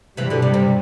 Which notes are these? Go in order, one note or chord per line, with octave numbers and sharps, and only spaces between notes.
G2 C3 E3 G3
B2 D3
C3
C3